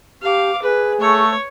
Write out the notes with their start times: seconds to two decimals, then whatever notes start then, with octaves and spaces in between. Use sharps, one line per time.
0.22 G4 F5 A5 C#6 D6
0.62 G#4 B4 G#5
1.01 A3 C#5 C#6